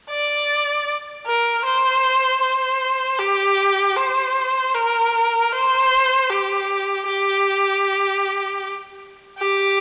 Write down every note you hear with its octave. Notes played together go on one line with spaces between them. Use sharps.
D5
A#4
C5
C5
G4
C5
A#4
C5
G4
G4
G4